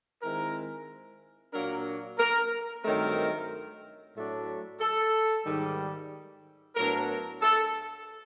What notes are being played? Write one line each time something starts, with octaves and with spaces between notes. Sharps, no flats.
D#3 G#3 C4 E4 A#4
A#2 F#3 A#3 D4 A#4
A#4
G2 D#3 F#3 A3 C4 A#4
A2 F#3 A3 D4
A4
G#2 D#3 G3
A2 F#3 B3 D4 A#4
A4